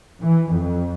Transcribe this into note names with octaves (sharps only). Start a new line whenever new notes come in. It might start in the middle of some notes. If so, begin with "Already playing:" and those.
E3
F2